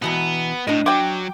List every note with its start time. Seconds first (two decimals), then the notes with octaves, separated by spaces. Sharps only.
0.02 B2 E3 B3 A#5
0.67 A2 D4 D#5
0.86 F#3 G5 D6